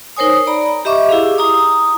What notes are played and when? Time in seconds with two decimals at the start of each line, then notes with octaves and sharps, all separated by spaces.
0.17 D#4 A#4 C5 C#5 G#5 D#6
0.47 D5 A#5 B5
0.85 G4 D#5 E5 C#6 D6
1.09 E4 G4 G#4 F5
1.38 E4 A#5 D#6